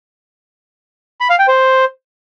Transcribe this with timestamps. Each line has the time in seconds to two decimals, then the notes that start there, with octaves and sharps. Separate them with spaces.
1.21 B5
1.30 F5
1.39 G5
1.48 C5